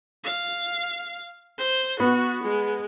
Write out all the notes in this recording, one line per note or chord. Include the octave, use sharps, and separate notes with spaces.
F5
C5
B3 F#4
G#3